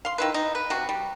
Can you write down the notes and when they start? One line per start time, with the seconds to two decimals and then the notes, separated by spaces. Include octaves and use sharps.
0.05 F5 C6
0.18 D#3 E4 B4
0.34 D#4
0.55 B4
0.70 C3 F#4
0.89 G3